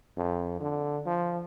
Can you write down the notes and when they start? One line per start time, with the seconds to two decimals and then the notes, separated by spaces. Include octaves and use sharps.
0.17 F2
0.61 D3
1.06 F3